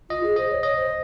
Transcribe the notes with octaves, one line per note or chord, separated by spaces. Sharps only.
F4 D#5
G#4
C5 D#5
C#5
C#5 D#5
C5